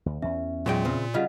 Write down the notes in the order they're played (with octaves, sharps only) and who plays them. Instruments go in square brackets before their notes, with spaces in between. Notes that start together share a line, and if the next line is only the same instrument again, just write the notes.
[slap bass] D2
[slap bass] E2 C#4 [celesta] E5
[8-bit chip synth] A#2 [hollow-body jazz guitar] F#3 G#3 G5
[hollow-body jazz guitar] C#3 C4
[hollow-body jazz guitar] C#3 G3 F4 [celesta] D#5 F5 F#5